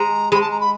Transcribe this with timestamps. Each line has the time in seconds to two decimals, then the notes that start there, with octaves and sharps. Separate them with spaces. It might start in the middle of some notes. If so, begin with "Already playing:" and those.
Already playing: G#3 A#5
0.31 G#3 B5
0.41 A5
0.51 A#5
0.60 B5